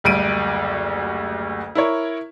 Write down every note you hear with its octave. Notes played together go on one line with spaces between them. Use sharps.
F#1 D2 G3 D7 D#7
E4 A#4 C#5